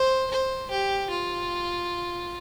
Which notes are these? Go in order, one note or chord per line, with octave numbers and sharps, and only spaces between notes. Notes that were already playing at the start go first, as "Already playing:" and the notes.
Already playing: C5
C5
G4
F4